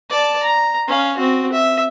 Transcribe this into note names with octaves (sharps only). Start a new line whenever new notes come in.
D5 A5
A#5
C#4 F5
C4 F#4
E5